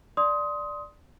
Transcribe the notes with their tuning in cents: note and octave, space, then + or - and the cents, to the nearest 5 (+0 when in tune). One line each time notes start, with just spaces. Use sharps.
D5 +0 C6 +0 D#6 +20